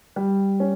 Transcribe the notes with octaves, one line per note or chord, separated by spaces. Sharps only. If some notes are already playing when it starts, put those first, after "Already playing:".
G3
C#4